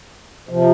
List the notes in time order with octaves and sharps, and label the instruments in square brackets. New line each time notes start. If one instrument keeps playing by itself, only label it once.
[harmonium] C3 F3